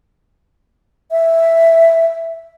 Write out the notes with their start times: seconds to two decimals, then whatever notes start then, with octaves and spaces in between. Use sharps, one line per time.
1.11 E5